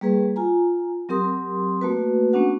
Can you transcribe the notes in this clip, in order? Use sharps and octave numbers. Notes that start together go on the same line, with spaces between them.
G3 A#3 G#4 B4
F4 G#5 A#5
F#3 C4 G4 A#4 C6 D#6
A3 A#3 F#4 B4
A3 B3 C#4 D4 F#4 F#5